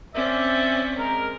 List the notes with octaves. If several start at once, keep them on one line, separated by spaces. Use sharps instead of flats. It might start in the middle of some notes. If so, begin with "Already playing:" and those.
C4 C#4 D5 E5
G#3 A#4